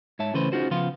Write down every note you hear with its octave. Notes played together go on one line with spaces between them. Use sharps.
G#2 C#5 E5 A5
C#3 E3 A3 C#4 B4 C5
C#4 D#4 F4 F#4 G#4 C5
C#3 F3 B3 F5 C6